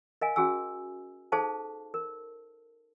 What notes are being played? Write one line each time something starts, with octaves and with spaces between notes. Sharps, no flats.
A#4 D#5 F5 G#5
C#4 F#4 G#4 G#5 E6
D#4 G#4 A4 C5 F5 A5
A#4